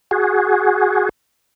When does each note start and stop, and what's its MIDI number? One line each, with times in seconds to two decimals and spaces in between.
0.11 1.09 66
0.11 1.09 68